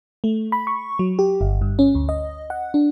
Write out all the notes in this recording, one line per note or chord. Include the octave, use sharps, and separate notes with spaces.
A3
B5
C#6
F#3
G4
G1
G2
C#4
D2
D#5
F#5
D4